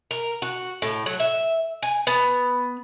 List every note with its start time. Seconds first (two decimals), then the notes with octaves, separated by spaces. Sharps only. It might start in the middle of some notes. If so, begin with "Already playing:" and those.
0.11 A#4
0.42 F#4
0.82 A2
1.06 F#3
1.20 E5
1.83 G#5
2.07 B3